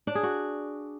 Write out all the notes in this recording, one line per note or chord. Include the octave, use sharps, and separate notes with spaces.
D4
G#4
F#4